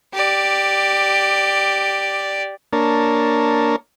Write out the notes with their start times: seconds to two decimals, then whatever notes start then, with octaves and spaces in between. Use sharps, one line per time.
0.13 G4 D5
2.73 A#3 D4 A#4 C#5 A5